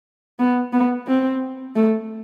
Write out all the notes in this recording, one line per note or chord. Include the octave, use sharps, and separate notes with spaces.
B3
B3
C4
A3